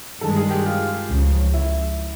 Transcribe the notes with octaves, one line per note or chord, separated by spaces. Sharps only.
G2 D#3 G#3 A4
G#4
G4
F4
C#2 C#3 F3
E4